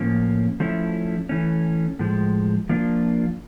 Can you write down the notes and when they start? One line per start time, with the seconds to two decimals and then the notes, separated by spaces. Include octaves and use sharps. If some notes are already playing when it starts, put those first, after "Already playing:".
Already playing: A2 F3 A#3 C#4
0.60 F3 A3 C#4 E4
1.29 E3 A3 C#4
1.99 A2 F3 G#3
2.69 F3 A#3 D4 F4